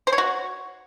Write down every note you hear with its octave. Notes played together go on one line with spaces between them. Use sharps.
C5
C#5
F#4